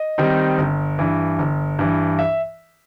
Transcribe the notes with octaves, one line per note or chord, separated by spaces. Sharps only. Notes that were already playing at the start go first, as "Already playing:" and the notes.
Already playing: D#5
D#3 G3 C4 D#4
G1
G2 E3
G1
G2 E3
E5